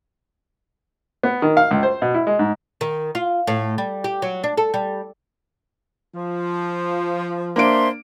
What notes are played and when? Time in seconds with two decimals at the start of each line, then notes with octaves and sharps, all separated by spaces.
1.23 B3
1.42 D#3
1.57 F5
1.71 C#2
1.83 C5
2.02 B2
2.14 E4
2.27 G#3
2.39 G#2
2.81 D#3
3.15 F4
3.47 A2
3.78 G3
4.04 G4
4.22 F#3
4.44 D4
4.57 A4
4.74 G3
6.14 F3
7.56 A#3 D4 C5 E5 C6 D7